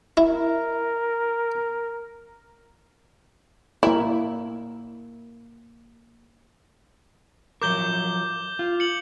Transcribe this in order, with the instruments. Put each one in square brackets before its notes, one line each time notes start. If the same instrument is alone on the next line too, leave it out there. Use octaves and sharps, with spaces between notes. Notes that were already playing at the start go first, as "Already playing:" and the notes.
[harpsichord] E4 [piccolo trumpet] A#4
[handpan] A#3 A#4 [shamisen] E4
[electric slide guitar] F3 F#3 A#4 [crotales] D6 G6 G7
[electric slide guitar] F4
[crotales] C#7 F#7